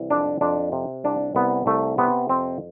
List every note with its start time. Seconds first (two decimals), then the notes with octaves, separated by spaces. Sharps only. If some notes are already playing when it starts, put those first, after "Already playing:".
Already playing: C2 E3
0.10 F2 D4
0.41 F2 D4
0.72 C3
1.04 C2 D4
1.35 C2 B3
1.66 C2 A3
1.98 C3 B3
2.29 F2 C4